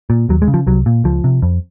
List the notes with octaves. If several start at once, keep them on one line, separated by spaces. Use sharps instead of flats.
A#2
D#2 F#3
G#3
C#3
F3
C2 F#3
A#2
C#2 F3
C3
F2